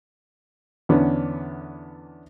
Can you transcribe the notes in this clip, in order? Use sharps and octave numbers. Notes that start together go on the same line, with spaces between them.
E2 D3 B3 C#4 D4